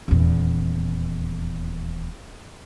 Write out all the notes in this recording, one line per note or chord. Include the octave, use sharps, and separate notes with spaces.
D#1 E2